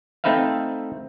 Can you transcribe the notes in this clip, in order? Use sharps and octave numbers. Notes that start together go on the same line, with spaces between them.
A3 C4 D#4 B4 E5 F5